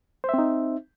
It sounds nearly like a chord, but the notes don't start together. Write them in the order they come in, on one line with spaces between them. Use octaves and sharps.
C5 E5 C4 D#4